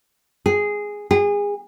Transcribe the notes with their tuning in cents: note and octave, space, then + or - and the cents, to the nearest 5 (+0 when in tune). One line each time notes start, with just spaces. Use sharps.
G#4 -5
G#4 -30